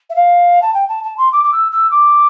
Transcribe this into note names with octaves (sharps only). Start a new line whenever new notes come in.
E5
F5
A5
G5
A5
A5
C6
D6
D6
E6
E6
D6